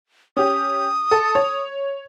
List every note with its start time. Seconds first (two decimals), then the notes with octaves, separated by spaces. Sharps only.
0.37 C#4 G4 D#6
1.11 A4
1.35 C#5